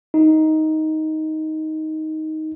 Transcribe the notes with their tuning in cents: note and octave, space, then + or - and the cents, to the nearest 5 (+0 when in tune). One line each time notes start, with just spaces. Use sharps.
D#4 +10